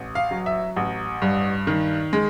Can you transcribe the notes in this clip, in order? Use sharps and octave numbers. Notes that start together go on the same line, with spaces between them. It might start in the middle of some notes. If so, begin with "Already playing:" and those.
Already playing: A1
F5
F#3
E5
A1
G2
D#3
G#3